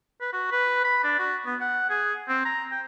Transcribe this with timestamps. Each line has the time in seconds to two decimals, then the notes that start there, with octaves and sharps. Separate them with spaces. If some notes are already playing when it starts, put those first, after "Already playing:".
0.21 B4
0.33 F#4
0.52 B4
0.85 B5
1.04 D4
1.19 F#4
1.46 B3
1.61 F#5
1.90 G#4
2.28 C4
2.45 A#5
2.72 G5